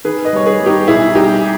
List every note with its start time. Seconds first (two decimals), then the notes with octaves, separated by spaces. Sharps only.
0.04 D#3 G#4 B4
0.25 B4 D#5
0.33 G3 C#5
0.46 G#4 B4
0.60 G3
0.66 D#4 G4
0.88 B1 E4 G#4
1.15 G3 D#4 G4